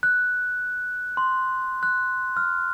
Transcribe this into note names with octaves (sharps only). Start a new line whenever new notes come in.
F#6
C6
F#6
F6